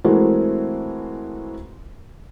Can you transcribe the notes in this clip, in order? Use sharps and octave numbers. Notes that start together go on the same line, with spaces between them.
E3 G#3 A3 C4 F#4 A#4